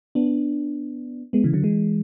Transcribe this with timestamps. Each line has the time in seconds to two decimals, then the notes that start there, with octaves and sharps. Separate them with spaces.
0.15 B3 D4
1.33 G#3 B3
1.44 C#3 E3
1.53 D3 F#3
1.63 E3 G#3